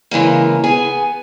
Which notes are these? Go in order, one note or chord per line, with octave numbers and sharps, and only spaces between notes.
C#3 E3 G#3 A#3
B3 G#4 G#5